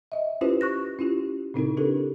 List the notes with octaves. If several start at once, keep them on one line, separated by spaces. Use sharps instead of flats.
D#5 E5
C#4 E4 F4 G4 B4 C5
C#6 F#6 A#6
C#4 E4 F4 G4
A#2 C#3 C4 D#4 E4 A#4
D4 E4 G4 A4 B4